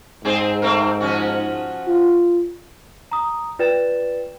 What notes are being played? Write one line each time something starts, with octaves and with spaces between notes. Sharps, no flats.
G#2 C4 G#4 C5
A3 C4 A#4
F3 C#4 F#4
F4
A#5 D#6
F4 B4 D5 G5 A6 E7